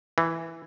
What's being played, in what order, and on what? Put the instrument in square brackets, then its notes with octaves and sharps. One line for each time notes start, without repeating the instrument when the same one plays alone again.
[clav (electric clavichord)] E3